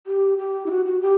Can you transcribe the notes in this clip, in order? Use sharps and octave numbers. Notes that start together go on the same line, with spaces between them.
G4
G4
E4
F#4
F#4
G4